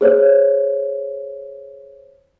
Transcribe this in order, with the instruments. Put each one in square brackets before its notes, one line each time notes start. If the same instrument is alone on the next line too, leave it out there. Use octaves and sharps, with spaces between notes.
[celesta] G#4 C5 C#5